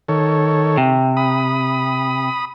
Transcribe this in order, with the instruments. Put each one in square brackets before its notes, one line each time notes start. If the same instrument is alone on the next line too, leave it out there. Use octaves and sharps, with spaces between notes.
[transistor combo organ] D#3 A4 C#5
[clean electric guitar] C3
[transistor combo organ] B5 D#6